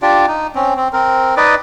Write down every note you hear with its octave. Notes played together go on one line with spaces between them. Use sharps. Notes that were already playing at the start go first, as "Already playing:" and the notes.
D4 F4 G4 D5
D#4
C4 C#4
C4
C4 A#4
D#4 B4 D5 D#5